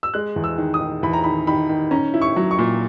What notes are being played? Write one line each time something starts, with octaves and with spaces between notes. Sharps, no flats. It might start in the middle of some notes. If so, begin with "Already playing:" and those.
E6
G#3 F#6
E2
E6
D#3
D#6
D#3
E2 B5
A#5
D#3 B5
D#3 B5
D#3
C#4 A#5
E4
C#6
F#3
C#6
A#2